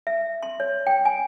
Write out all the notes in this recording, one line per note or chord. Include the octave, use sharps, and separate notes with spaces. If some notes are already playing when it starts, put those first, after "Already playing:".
E5
C6
C#5
G5
G#5